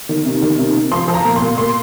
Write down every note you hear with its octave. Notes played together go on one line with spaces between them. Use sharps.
D#3
C3
D#3
C3
C3
F3 C6
F3
A#5
A#2
C6
A#2
A#2 C6